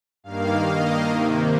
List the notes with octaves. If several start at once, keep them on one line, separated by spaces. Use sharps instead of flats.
G2 D#3 A#3 F5
D#5
C3 D#3 A#3